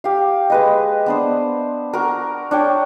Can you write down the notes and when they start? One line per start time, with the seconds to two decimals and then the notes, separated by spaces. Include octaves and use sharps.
0.04 G4 F5
0.50 G#3 B4 D#5
1.06 B3 D4 C5
1.93 F#4 A#4
2.51 D4 C#5 G5